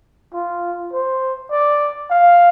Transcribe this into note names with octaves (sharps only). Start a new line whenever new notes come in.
F4
C5
D5
F5